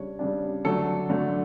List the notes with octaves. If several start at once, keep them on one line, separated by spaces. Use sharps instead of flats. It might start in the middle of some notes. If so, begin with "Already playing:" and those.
Already playing: C#3 G3 D4 C#5
C#3 G3 D4
D3 F#3 A3 D4 A4
D3 F#3 A3 D4